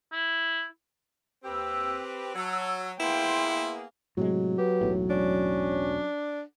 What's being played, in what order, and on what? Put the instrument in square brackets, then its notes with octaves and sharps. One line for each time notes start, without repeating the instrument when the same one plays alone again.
[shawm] E4
[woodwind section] D#2 G5 E6 [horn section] C4 G4 B4
[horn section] F#3 [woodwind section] A5 E6
[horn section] A#3 B3 G#4 [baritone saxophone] E4 [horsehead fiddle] G5 [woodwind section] C6
[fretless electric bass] A2 C3 G#3 [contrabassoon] F#3
[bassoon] B3 [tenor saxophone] G4
[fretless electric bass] E1 B1 A2
[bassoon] C#4 [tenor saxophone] D4